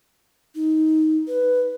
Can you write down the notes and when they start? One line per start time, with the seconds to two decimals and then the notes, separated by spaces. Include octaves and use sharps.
0.55 D#4
1.28 B4